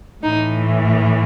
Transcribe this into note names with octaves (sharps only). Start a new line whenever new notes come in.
A2 E3 D#4